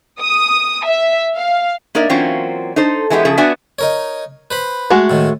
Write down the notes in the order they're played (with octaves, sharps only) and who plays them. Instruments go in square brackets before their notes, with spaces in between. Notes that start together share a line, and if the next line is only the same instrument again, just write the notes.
[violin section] D#6
E5
F5
[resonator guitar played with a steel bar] A#3 D#4 A#4 D5 E5
E3 F#3 A#3 C4 C#4 F4
D#4 A4 C5
E3 G#3 B3 D4 G4
C#3 F3 G#4 A4
B3 D4 F#4 D5 E5 G#5
[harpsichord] D#4 A#4 C#5
B4 C5 B5
[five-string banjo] G#3 A3 F#4
[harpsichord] A2 D#3